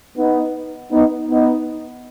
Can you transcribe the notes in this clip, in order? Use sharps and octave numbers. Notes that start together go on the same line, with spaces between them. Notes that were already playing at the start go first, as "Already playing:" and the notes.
B3 D#4
B3 D#4
B3 D#4